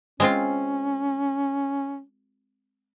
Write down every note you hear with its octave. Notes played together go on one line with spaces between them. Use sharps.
G#3 C4 C#4 F4